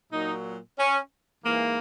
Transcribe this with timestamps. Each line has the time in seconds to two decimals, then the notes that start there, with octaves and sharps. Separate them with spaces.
0.12 A#2 F#3 D#4
0.78 C#4
1.43 G#2 E3 A#3